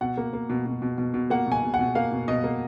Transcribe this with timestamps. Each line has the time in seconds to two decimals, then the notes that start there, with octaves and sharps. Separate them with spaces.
0.01 B2 F#5
0.17 A#3
0.33 A#3
0.50 B2
0.66 B2
0.82 B2
0.98 B2
1.14 B2
1.30 A#3 F#5
1.46 B2
1.52 G#5
1.63 B2
1.74 F#5
1.79 B2
1.95 A#3 F5
2.12 B2
2.28 B2 D#5
2.44 A#3